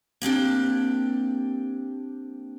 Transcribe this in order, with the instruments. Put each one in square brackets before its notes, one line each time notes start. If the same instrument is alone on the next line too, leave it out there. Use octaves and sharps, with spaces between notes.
[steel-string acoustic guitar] A#3 C4 D4 G4